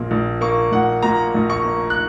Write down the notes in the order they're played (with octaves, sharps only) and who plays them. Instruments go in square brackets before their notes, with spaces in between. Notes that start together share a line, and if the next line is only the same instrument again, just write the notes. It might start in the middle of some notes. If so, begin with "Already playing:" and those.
Already playing: [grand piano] A#1 A#2 A#3
A#1
A#3 C#6
A#1 F#5
A#2 A#5
A#1
C#6
A#3
F#6